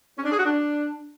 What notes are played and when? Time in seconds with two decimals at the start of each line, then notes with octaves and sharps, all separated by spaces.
0.18 C#4
0.25 D4
0.32 G#4
0.39 F#4
0.46 D4